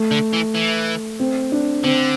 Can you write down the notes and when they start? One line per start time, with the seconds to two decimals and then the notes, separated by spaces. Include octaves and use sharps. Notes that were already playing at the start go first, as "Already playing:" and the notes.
Already playing: A3
0.11 D3
0.33 E3
0.55 E3
1.20 C4
1.52 D4
1.84 D3 C4